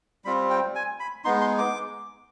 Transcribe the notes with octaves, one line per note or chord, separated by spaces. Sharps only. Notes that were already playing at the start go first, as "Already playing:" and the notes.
G3 C4 F4 B5
G5
G#5
B5
G#3 B3 D#4 C6
C6
D6